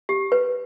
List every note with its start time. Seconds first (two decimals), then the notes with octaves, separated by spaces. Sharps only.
0.09 G4
0.32 B4